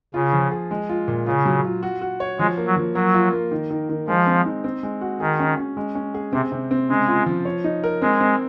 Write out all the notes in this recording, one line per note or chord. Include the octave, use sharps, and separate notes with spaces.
C#3 F4
F3
G#4
G#3
F4
A#2
C#3 F4
F#3
F4
F#4
F#4
C#5
F3 G#3
A#3
F#3
F3
F#3 A#3
F4
A#3
D#3
D#3
D#3
F3 G#3
C4
D#4
C4
G#3
F#4
D#3 G#4
C#4
C#4
G#3
C#4
G#4
C3 C4
C3
C4
C#3 G#3
F4
F3
C#5
D#4
A#4
G#3 C4
C4